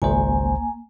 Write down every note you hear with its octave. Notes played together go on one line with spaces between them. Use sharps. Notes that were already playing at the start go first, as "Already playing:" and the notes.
G#1 C#2 A#3 C5 G#5